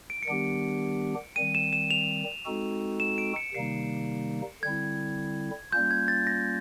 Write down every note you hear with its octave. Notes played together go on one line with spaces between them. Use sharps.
D7
C#7
D#3 G3 B3 D4 G4 D7
D#3 G3 C4 D#7
E7
E7
F7
G#3 C4 D#4 F#4 A4
E7
D7
C#7
C3 D#3 G3 A#3 D#4 C7
D3 G3 C4 E4 G#6
G3 A#3 C#4 F4 G6
G#6
A6
A#6